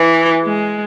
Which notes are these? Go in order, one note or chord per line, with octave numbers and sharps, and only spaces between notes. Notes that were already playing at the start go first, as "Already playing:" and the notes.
Already playing: E3
G#3